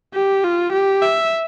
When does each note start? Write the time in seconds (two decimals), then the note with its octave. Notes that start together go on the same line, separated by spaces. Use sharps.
0.14 G4
0.44 F4
0.72 G4
1.02 E5